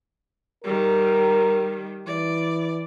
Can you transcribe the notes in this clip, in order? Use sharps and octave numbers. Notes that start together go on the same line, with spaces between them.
D#3 G3 A#4
E3 D5